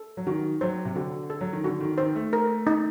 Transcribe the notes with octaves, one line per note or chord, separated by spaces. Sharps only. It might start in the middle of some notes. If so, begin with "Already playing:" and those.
Already playing: A4
F#3
D#3 F#4
F#3 C5
C3
D3 F#4
A4
F#3
D#3
D3 F#4
D#3
D#3 C5
A3
A#4
D#4